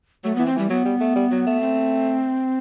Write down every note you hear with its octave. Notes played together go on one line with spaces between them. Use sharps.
F#3 A3
E3 B3
C4
E3 G3
F#3 B3
G3
A3
G3
F#3
A3
C4